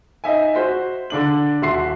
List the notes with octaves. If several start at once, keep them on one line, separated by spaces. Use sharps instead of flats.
D#4 E5 G#5
F#4 C5 B6
D3 D4 F#7
D#1 F#4 E5 C6 C7